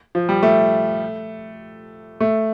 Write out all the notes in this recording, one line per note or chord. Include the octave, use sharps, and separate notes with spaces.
F3
G3
A3
A3